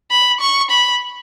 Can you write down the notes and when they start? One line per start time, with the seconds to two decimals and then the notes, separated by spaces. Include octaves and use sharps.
0.11 B5
0.41 C#6
0.70 B5